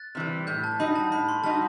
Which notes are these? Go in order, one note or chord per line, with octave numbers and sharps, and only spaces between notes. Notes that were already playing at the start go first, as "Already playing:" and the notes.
Already playing: F#6 A6
C3 E3 G3
A2 G6
A5
G3 D#4 F#4 B5
A5
A2 B5
C6
G3 D#4 F#4 A5